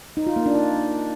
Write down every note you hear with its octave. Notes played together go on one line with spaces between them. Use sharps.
D#4
F4
A#3
D4
D#4